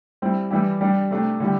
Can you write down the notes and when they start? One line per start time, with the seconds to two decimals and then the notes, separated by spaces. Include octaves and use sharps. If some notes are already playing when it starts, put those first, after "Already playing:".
0.22 G3 C4 E4
0.51 E3 G3 E4 G4
0.81 G3 D4 G4
1.11 C3 A3 D4 G4
1.40 D3 G3 E4 G4